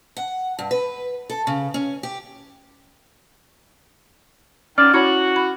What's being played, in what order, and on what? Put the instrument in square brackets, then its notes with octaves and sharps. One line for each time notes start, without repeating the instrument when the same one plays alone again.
[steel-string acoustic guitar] F#5
G2
B4
A4
C#3
C#4
G4
[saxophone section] D#3 F#3 D5 [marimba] C#4 [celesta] F6
[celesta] E4 [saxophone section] F#4 [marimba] C#5 B5 G#6
[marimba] B5